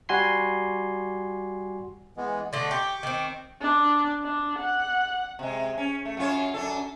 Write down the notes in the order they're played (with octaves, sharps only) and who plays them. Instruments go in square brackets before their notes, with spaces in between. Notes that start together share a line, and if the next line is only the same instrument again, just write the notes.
[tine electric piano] G3 F#4 G#5 C6 C7
[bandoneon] E3 G#3 B3
[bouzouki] D3 A3 [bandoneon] D5 D#5 C6
[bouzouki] G4 [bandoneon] C#6 D6
[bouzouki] D#3 C4
[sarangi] D4
D4
F#5
[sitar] C3 G#3
C#4
A3
F#2 F4 C#5
F#2 D4 A4